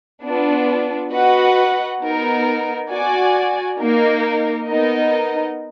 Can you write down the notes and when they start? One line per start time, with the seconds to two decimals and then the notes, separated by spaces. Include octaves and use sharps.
0.23 B3 D4 F4
1.12 F#4 B4 D#5 F#5
2.01 B3 D#4 A#4
2.90 F#4 D5 G#5
3.79 A#3 D#4 A#4
4.68 B3 D#4 A#4 D#5